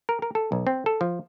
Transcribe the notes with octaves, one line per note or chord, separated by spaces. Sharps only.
A#4
A#4
A4
B1
C4
A4
F3